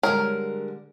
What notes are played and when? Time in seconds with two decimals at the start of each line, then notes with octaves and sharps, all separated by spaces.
0.03 D3 G3 G#3 A#4 C#5